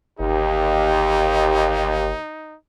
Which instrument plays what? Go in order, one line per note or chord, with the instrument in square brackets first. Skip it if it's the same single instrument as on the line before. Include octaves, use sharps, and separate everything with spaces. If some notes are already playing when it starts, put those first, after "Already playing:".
[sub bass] G1 [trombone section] D#2 [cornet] D#4 [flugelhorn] G4